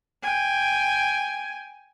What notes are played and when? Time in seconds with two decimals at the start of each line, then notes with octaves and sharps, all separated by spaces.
0.23 G5 G#5